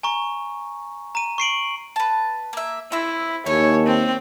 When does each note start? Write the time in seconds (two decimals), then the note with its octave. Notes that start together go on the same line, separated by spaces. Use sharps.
0.03 G#5 A#5 C#6
1.15 A#5 D#7
1.38 C#6 C7 D7 F#7
1.96 B4 A5
2.53 A#3 E5
2.92 C4 E4 E5 E6
3.46 D#2 A4 C#5 G#5
3.87 C4